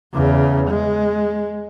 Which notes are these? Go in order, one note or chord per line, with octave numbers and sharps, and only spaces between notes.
E2 C#3
G#3